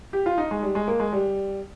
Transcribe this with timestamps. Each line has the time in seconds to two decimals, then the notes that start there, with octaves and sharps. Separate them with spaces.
0.13 G4
0.26 F4
0.38 D#4
0.51 G#3
0.63 G3
0.75 G#3
0.88 A#3
1.00 G#3
1.13 G3